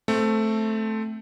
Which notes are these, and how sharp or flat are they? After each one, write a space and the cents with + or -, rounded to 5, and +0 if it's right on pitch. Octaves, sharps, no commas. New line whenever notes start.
A3 +0 C4 +0